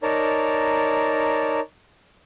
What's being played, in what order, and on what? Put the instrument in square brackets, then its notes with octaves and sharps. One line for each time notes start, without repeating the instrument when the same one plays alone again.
[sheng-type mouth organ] D#4 A#4 C#5 D5 A5 A#5